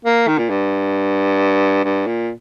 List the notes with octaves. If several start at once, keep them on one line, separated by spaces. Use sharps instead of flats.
A#3
D#3
A#2
G2
G2
A#2